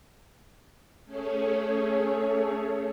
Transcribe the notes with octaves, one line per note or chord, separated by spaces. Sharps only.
A3 C#4 G#4 A4 C#5